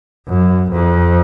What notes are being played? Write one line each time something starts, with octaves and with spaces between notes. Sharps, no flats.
F#2
F2